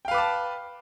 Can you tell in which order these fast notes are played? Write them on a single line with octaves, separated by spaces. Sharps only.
G5 F5 B4 D6 A5